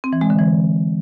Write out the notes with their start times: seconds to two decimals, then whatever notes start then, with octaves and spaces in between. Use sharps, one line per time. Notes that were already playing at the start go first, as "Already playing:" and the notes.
0.04 C4
0.13 E3
0.21 G#3
0.30 D3
0.39 E3